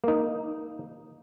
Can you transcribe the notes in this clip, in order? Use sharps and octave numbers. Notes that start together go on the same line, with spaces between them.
A#3 D#4